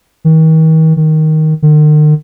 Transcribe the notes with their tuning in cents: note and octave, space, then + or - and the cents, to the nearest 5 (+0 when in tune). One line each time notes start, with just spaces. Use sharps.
D#3 +40
D#3 +5
D#3 -45